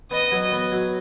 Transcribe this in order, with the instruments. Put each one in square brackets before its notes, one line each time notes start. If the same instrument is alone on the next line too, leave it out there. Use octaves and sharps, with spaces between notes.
[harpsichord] B3 [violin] D#5
[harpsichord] F#3
B3
F#3